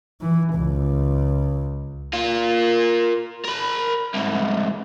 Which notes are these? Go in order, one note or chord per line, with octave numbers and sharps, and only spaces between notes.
E3
C#2
A#3 F4
A#4 B5
C2 G#2